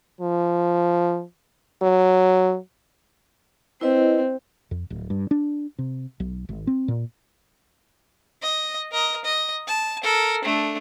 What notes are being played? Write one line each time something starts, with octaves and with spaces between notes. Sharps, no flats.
F3
F#3
C4 E4 B4 D#5
F2
D1
G2
D4
C3
B1
G#1
C4
A#2
D#5
A#4 D#5
D#5
A5
A4 A#4
A3 D4